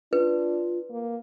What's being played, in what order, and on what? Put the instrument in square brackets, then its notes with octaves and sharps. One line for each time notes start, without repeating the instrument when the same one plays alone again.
[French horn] D4 [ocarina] F4 [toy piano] B4
[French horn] A#3